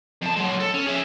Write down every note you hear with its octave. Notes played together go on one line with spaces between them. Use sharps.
F2 A5
F#3 G#3
A4
C#4
G#4 E5